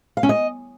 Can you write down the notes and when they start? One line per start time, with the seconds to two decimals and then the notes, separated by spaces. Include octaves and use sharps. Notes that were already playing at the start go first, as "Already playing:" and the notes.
0.17 F5
0.23 C#4
0.29 D#5